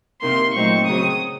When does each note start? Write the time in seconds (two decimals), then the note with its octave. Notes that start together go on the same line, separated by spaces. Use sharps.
0.21 C3 D#3 A#3 C6
0.53 A#2 F#3 A3 C4 D#4 C#6
0.86 C#3 F#3 C4 D#6